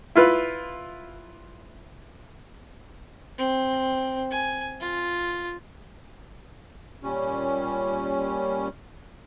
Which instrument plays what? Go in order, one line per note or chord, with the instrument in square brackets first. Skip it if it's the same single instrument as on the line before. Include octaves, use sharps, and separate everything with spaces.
[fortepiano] E4 F4 B4
[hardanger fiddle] C4
G#5
F4
[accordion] A#2 G3 C#4